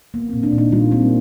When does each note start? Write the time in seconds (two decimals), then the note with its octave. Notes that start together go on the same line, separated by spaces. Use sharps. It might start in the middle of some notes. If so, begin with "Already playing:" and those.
0.14 A#3 B3
0.29 A#2 C4
0.43 D4
0.52 A#2
0.58 D#4
0.72 G3 F4
0.91 A#3 C4